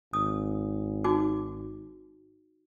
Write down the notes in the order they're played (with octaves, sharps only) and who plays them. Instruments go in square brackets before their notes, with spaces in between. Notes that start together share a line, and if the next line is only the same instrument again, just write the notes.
[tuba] G#1 [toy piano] D#6
[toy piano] D#4 F#4 D6